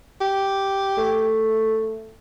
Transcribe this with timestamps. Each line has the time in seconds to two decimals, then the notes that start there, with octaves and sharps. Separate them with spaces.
0.21 G4
0.97 A3